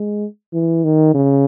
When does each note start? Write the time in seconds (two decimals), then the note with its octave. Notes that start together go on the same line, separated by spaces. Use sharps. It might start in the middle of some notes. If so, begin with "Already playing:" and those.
Already playing: G#3
0.54 E3
0.84 D#3
1.14 C#3